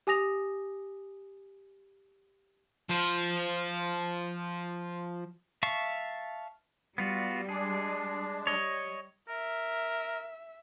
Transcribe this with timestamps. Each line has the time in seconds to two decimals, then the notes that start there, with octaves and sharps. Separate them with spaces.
0.07 G4 G#5 D#6 A#6 F7
2.89 F3 C5
5.63 E5 F5 A5 C#6
6.98 G3 B3 F4 F#4
7.49 G#3 D4 G#4
8.47 G3 C#5 D#5
9.29 A#4 E5